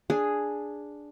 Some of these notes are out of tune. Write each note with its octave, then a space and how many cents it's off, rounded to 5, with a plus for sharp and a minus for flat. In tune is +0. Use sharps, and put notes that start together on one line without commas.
D4 +0 G#4 +0